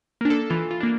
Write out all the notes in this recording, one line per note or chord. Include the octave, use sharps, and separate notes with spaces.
A#3 D4
A4
E3 F4
F4
A#3 D4